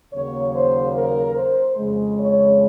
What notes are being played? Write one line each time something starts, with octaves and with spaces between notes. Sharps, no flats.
D#2 C#3 F#3 A#3 C#5
C5
A#4
C5
F2 C#3 G#3
C#5